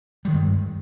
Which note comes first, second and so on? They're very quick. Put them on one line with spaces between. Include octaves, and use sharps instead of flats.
G3 D#3 G#3 G2